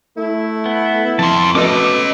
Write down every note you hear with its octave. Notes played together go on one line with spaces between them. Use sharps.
A3 E4
B3
F2 A5 C6
B2 A3 C#4 D#5 D6 E6